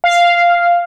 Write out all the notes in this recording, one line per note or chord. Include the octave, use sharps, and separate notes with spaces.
F5